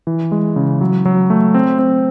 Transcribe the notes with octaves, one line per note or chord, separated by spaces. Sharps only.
E3
G#3
C#3
F#3
F#3
A3
C4
C4